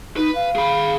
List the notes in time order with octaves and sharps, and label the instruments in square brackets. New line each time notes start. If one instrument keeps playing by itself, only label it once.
[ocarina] D#4 [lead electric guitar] B4
[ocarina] F5
[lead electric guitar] G#4 B5